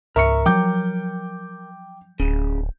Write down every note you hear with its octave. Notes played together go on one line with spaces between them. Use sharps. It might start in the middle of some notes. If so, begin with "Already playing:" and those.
C#2 G#2 A#4 E5 C#6 C#7
F3 F#3 G5 D6 G6
D1 C#3